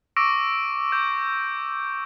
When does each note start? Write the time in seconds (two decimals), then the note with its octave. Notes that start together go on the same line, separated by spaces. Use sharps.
0.16 C#6 D6 E6 A#6 D7
0.92 D6 G6